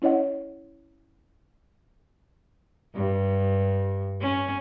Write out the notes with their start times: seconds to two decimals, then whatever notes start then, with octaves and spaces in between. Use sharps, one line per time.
0.02 C#4 E4 C#5 D#5 F#5
2.95 G2
4.21 C#4